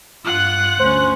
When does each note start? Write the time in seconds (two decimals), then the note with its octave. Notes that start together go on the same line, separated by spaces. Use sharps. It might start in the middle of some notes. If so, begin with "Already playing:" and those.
0.25 G2 F4 F#5 F#6
0.80 D2 C#4 C5